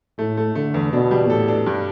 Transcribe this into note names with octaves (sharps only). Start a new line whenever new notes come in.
A2 A3
A3
D3 A3
E2
B2 D4
G3
A2 A4
D4
G2